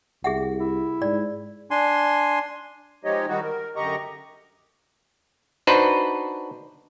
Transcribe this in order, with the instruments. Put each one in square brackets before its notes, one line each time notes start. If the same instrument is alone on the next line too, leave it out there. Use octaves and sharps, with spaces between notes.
[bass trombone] C2 [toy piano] G#4 E5 F#5
[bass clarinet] E4
[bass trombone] G#2 [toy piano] D5
[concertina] D4 G#5 C6
[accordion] F3 G#3 D#4 G4 C#5 D#5
D#3 G3 D#4 F#4
A#4
F#2 D3 G4 D#5 A#5 C#6
[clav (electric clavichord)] D4 D#4 F#4 B4 C5